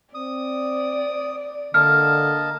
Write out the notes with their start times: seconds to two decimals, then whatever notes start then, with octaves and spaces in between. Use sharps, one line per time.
0.15 C4 D5 D#6
1.74 D3 A#3 D#5 A5 F6